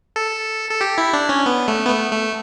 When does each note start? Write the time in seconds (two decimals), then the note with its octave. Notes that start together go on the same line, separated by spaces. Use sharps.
0.16 A4
0.70 A4
0.81 G4
0.98 E4
1.13 D4
1.29 C#4
1.46 B3
1.68 A3
1.85 B3
1.89 A3
2.12 A3